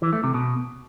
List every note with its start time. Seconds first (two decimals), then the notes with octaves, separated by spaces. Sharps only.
0.02 E3
0.13 A3
0.24 C3
0.34 B2